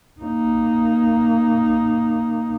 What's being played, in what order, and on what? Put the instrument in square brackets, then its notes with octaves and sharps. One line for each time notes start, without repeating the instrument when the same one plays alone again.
[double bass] A#3 D#4